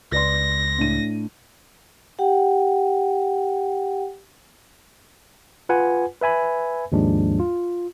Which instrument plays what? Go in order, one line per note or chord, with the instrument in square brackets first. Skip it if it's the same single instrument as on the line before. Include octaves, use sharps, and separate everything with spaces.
[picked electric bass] C#2 [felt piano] B4 D5 C6 [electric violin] A#6
[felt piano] A2 D4 D#7
[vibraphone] G4 F#5 G5
[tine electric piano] F4 B4 F#5 G#5
B4 E5 G#5 B5
D#2 G#2 F3 G#3 D4
F4